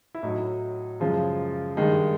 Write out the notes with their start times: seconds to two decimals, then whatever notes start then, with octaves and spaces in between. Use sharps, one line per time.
0.15 E4
0.23 A2 F#3 D#4
1.00 F#2 C#3 F3 G#3
1.77 G2 D#3 G#3 D#4